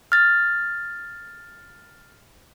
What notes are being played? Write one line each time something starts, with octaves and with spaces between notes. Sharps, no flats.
F6 A6